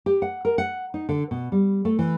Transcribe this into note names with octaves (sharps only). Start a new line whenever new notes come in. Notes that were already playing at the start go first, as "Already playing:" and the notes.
G4
F#5
A#4
F#5
D#4
D3
B2
G3
A3
E3